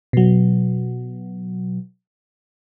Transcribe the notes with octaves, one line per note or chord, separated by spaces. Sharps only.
B2 F#3